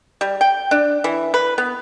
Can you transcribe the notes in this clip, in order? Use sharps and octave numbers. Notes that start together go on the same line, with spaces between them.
G3
G5
D4
E3
B4
B3